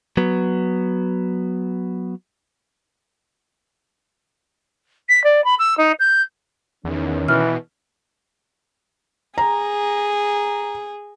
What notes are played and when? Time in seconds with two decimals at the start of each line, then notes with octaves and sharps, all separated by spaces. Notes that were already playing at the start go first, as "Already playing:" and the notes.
0.17 F#3 B3
5.09 B6
5.24 D5
5.44 B5
5.58 E6
5.77 D#4
5.99 G6
6.85 E2 D#3 C#4
7.28 B2 E3 F6
9.38 G#4 A#5